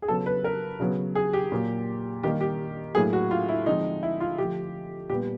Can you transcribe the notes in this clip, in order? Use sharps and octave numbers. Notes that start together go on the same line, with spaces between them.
G#4
C#3 F#3 B3 A4
B4
A#4
C#3 F#3 B3
G#4
G4
A#2 F#3 A#3
D#3 G3 A#3 G4
G4
A2 F#3 A#3 G#4
F#4
F4
E4
D3 F3 G#3 C4 D#4
E4
F4
D3 F3 A3 G4
A#2 G3 B3 G4